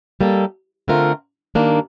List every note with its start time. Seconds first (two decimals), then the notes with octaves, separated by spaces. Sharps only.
0.21 G3 A#3 D#4 A4
0.88 D3 A3 C4 F4 A#4
1.55 G2 D#3 A#3 D4